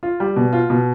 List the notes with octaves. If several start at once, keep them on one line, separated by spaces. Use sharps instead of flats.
F4
G3
B2
F4
B2